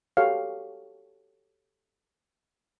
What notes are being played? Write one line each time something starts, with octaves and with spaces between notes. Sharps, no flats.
F#4 G4 A4 C#5 F5